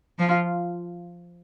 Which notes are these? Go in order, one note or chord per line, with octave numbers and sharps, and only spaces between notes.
F3 F4